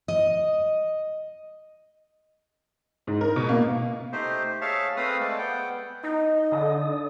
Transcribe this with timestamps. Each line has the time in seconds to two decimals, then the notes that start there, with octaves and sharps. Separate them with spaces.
0.08 D#5
3.07 G#2
3.21 A#4
3.36 B2
3.49 A#3
4.12 A3 D#4 G4 C5
4.61 G#4 C#5 E5 F5 A5
4.97 A3 C4 B4 F5 D#6
5.20 G#3 A4 D5
5.38 B3 F#5 G5
6.04 D#4 D#5
6.52 D3 D5 D#6